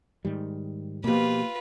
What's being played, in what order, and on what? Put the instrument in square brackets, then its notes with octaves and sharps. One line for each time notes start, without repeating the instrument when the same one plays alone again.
[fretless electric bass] G#2 D#3 G3
[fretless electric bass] B2 F3 [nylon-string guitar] A#3 G4 [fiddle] F4 B4